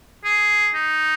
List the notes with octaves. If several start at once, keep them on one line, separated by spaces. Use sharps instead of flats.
G#4
D#4